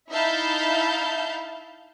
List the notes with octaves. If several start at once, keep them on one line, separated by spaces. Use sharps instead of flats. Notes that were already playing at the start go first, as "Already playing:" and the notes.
D#4 E4 E5 F5 A5 G6